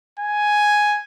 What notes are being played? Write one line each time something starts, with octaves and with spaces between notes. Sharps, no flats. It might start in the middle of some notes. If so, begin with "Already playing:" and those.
G#5